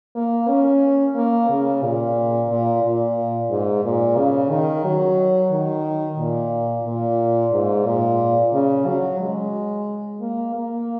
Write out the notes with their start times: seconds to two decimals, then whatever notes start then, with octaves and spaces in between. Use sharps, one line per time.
0.15 A#3
0.48 C#4
1.16 A#3
1.50 C#3
1.83 A#2
2.50 A#2
2.83 A#2
3.50 G#2
3.84 A#2
4.18 C#3
4.50 D#3
4.84 F#3
5.51 D#3
6.18 A#2
6.86 A#2
7.52 G#2
7.86 A#2
8.53 C#3
8.86 F#3
9.20 G#3
10.20 A#3
10.55 A#3